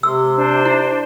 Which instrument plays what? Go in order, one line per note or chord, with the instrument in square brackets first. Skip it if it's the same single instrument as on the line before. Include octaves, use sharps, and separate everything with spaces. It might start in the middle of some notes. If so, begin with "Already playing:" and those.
[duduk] C3 [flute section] C6 [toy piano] E6
[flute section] D4 C5
[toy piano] E4